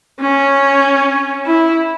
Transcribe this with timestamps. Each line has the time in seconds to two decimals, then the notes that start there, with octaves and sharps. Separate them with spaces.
0.21 C#4
1.46 E4